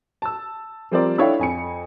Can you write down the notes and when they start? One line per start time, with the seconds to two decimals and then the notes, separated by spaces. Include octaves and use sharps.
0.22 A5 E6
0.92 F3 G3 C4 G4 A#4 D5
1.18 D4 E4 A4 C#5 F5 G5
1.39 F2 G#5 C#7